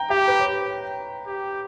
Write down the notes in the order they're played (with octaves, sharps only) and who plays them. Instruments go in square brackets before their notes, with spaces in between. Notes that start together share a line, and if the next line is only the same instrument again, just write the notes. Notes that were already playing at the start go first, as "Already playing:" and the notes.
Already playing: [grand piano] G5 A#5
[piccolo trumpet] G4 [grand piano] G5
[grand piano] B4
C#5
[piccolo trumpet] G4